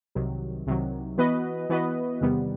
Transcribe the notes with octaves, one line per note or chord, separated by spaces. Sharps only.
C2 C3 D#3 F#3
C2 C3 D#3 F#3
E3 B3 F#4 B4 D#5
E3 B3 F#4 B4 D#5
E2 C3 D#3 G3 B3